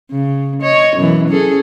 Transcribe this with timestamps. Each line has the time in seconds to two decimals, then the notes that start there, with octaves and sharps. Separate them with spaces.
0.11 C#3
0.62 C#5 D#5
0.97 F#2 B2 E3
1.28 C#4 G#4 A4